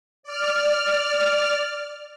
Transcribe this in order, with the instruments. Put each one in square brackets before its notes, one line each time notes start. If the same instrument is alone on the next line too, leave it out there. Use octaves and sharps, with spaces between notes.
[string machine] D5 F6